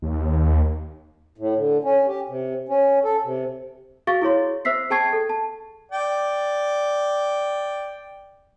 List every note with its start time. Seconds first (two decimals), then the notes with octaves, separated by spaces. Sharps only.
0.02 D#2
1.38 A2
1.57 D3
1.84 C#4
2.07 G4
2.28 C3
2.69 C#4
3.04 A4
3.24 C3
4.07 F#4 G#4 F5 C#6 A6
4.22 E4 G#4 C#5 C6
4.65 C5 E5 E6 B6 C7
4.90 G#4 G5 A5 C#6 G#6 C7
5.12 A4
5.30 A5
5.92 D5 G5